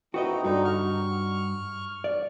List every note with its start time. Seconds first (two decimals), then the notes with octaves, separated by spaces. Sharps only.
0.14 A2 C4 D#4 F#4 B4 D#5
0.44 G2 D3 D#4 F#4
0.65 C#6 F6
2.04 D5